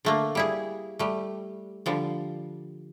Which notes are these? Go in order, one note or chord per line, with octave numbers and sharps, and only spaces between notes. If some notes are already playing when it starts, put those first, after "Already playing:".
D3 A3 A#3
G3 E4 G#4
G3 A3
D3 F3 G3